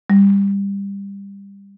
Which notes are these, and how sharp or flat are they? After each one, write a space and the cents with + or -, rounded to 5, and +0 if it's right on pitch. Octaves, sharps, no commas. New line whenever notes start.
G3 +20